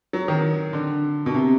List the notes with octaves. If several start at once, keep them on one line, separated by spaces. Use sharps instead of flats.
F#3
D#3
D3
B2
C3